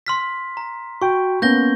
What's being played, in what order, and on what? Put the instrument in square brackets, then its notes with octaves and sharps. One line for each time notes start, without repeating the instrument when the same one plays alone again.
[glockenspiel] C6 F6 B6
A#5
[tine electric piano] F#4 G5 [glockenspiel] C#6
[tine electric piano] A#3 B3 C#4 [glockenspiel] G6 A#6 G7